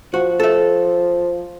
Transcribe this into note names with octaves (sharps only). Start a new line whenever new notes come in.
F3 F#4
A4 E5